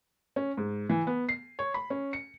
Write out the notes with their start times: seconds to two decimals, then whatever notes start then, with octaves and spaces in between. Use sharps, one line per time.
0.36 C#4
0.57 G#2
0.90 E3
1.07 B3
1.29 C7
1.59 C#5
1.74 B5
1.90 C#4
2.13 C#7